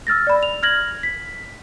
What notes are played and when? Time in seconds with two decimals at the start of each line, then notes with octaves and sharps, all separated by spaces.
0.07 E6 F6 A6 A#6
0.27 D5 B5
0.43 F7
0.63 F6 G#6 A#6 F#7
1.03 B6